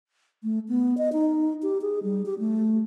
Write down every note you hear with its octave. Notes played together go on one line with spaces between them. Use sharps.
A3
B3
D#5
D#4
G4
G#4
G3
G4
A3